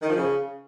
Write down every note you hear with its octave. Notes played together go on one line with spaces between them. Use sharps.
D#3
F3
C#3